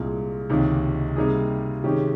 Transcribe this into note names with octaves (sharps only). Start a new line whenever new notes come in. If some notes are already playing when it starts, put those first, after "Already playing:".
Already playing: C2 A#2 G#3
C#2 C3 D#3 A#3
C3 G3 A#3 D#4 G#4
C3 D#3 G#3 C#4 G4